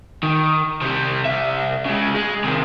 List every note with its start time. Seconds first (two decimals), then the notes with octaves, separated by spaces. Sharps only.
0.23 D#3
0.81 C3 G3
1.25 C2 E5
1.86 C#3 G#3
2.15 G#3
2.44 C3 D#3